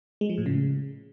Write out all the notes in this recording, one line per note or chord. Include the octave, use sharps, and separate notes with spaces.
G#3
F3
A2
C#3